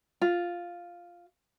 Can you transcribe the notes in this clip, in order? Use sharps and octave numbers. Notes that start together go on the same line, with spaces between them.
F4